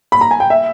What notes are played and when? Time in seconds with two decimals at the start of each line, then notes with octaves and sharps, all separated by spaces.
0.12 B5
0.21 A#5
0.31 G#5
0.40 G5
0.50 E5